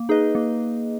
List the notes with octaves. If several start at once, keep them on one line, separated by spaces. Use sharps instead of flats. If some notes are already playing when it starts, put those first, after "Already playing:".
Already playing: A#3
D#4 G#4 B4 D#5
A#3